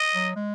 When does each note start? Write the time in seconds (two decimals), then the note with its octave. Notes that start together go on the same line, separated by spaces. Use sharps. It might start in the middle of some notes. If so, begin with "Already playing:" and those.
Already playing: D#5
0.14 F#3
0.36 G#3